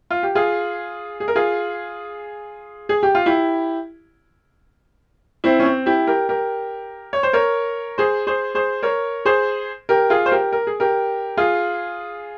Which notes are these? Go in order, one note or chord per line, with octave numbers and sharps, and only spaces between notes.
F4
G4
F4 G#4
G#4
A#4
F4 G#4
G#4
G4
F4
E4 G4
C4 E4
C#4
C4
E4 G4
G4 A#4
G4 A#4
C#5
C5
A#4 C#5
G#4 C5
G#4 C5
G#4 C5
A#4 C#5
G#4 C5
G4 A#4
F4 G#4
C5
G4 A#4
A#4
G#4
G4 A#4
F4 G#4